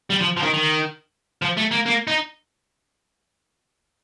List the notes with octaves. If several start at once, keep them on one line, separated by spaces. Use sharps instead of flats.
G3
F3
F3
D#3
D#3
F3
A3
A#3
A#3
D#4